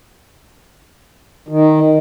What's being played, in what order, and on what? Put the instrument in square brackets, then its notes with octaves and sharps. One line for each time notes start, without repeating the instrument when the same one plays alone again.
[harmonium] D#3